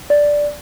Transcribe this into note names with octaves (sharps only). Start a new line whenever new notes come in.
D5